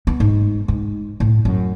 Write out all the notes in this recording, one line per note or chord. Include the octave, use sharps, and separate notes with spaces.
B3
G#2
G#2
A2
F#2